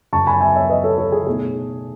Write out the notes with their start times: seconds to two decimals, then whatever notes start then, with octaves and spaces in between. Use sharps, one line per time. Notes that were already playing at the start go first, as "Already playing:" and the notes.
0.13 F#2 C#3 F#3 A5 C#6
0.27 G#5 B5
0.41 E5 G#5
0.55 C#5 E5
0.69 B4 D#5
0.84 A4 C#5
0.98 A4 C#5
1.12 G#4
1.27 B2 A3 D#4 G#4